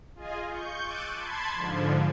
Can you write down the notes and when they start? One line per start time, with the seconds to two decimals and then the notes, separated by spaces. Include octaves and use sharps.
0.15 F4 G#4 D#5 G#5
0.48 C#6 G6
0.83 D6 E6 F#6 A6 C#7 D#7
1.14 A5 B5 C6 G#6
1.54 G#2 D3 F3